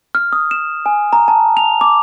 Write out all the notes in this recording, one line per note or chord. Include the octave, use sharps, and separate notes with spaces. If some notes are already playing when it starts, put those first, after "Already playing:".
F6
D#6
E7
G#5
A#5
A5
F7
D6